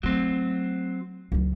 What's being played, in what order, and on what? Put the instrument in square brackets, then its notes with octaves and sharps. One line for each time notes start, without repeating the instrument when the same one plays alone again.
[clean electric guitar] F#3 C4 [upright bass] A3
[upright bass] C#2 F#3